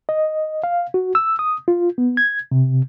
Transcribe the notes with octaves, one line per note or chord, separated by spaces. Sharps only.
D#5
F5
F#4
E6
D#6
F4
B3
G#6
C3